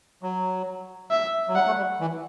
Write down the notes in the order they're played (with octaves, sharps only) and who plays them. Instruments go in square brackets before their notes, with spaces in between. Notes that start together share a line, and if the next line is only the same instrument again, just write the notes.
[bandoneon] F#3
[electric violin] E5
[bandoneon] F#3
[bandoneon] G3 [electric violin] F#5
[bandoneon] A3
G3
E3